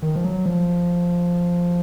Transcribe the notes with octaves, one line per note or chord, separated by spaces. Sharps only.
D#3
F3
F#3
F3